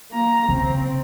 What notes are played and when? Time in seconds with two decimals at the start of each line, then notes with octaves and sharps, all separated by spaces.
0.11 A#3 A#5
0.49 C#3 C4